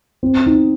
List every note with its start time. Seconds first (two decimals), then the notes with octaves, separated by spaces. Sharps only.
0.23 C4
0.46 D#4